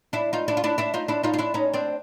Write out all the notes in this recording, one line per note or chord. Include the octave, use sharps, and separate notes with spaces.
D4 E4
D#4 F4
D4 E4
F4
D4 E4
D4 E4
D#4 F4
D4 E4
D#4 F4
F4
D4 E4
C#4 D#4
C4 D4